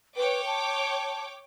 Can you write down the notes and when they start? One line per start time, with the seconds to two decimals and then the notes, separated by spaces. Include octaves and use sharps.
0.16 B4 C#5 G5 D6
0.45 A5